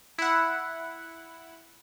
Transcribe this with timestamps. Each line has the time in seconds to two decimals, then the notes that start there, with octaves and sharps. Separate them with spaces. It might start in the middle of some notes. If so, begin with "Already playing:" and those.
0.18 E4 F#5